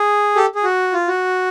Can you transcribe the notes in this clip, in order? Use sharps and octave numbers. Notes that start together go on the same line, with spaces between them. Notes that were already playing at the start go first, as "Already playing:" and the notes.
Already playing: G#4
G4 A4
G#4
F#4
F4
F#4